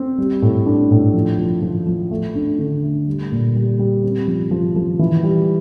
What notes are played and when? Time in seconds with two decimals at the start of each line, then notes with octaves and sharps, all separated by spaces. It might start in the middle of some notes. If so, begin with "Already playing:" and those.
Already playing: C4
0.18 G3
0.42 A2
0.66 D4
0.91 A2
1.14 F3
1.38 F3
1.62 F3
1.87 F3
2.11 A3
2.35 D4
2.59 D3
2.83 A3
3.07 G3
3.32 A#2
3.56 G3
3.79 G3
4.03 C4
4.28 F3
4.51 F3
4.76 F3
4.99 E3
5.23 G3